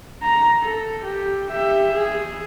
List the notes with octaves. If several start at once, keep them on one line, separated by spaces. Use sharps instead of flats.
A#5
A4
G4
G4 E5
G#4